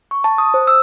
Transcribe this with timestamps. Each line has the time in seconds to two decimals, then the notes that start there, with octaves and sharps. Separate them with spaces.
0.11 C#6
0.24 A5
0.38 D#6
0.54 C5
0.67 E6